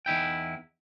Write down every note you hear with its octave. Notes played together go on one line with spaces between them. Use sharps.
E2 D#4 E4 G5